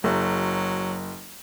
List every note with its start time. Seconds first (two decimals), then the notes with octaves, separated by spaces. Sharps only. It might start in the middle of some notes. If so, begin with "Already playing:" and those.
0.04 F#1 F#3